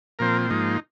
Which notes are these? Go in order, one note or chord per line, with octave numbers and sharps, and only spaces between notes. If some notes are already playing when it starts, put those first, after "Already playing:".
A#2 F3 C4 A#4
G#2 F3 A#3 D#4